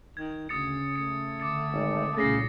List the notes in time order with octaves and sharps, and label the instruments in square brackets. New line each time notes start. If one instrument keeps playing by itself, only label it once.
[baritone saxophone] D#3 [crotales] G#6
[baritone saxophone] D2 [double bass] C#3 [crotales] D#6 A6 C#7
[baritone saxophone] A3 [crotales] C#7
[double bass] D3 [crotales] D6 A6 C#7
[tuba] G#1
[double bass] C2 A#2 [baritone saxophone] C#3 [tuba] A3 [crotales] A6 A#6 C7